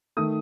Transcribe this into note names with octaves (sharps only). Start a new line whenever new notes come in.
D#3 A3 D#6